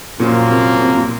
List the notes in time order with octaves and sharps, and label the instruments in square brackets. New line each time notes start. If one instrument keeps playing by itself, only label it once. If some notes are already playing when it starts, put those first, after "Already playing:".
[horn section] F#2 F3 A#3 [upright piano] A#2
[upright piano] C3
C3
A#2